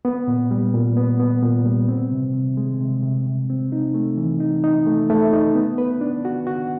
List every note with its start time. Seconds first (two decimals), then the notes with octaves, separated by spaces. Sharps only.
0.05 B3
0.27 A#2
0.51 G3
0.74 A#2
0.97 B3
1.20 B3
1.43 A#2
1.66 G3
1.89 C4
2.11 C3
2.34 C3
2.57 G#3
2.80 C3
3.03 C3
3.26 C3
3.50 C4
3.72 D#4
3.94 A3
4.17 E3
4.40 D#4
4.64 D#4
4.87 A3
5.10 A3
5.33 D#4
5.55 B3
5.78 B4
6.01 D4
6.25 F#4
6.47 F#4